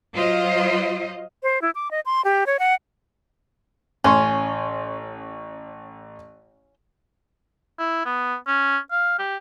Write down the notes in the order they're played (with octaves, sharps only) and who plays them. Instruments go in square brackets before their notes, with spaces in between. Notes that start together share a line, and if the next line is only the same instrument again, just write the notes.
[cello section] F#3 F4 C5 D#5
[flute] C5
E4
D6
D#5
C6
G4
C#5
F#5
[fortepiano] A1 C6 C#6 [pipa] C#4
[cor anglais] E4
B3
C#4
F5
G4